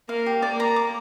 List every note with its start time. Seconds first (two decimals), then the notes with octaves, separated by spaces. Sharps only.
0.09 A#3 F5
0.26 G4
0.42 A#3 D5
0.60 A#5
0.76 D6